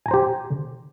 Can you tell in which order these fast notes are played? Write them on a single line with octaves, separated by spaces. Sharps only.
G#5 A#5 C5 G4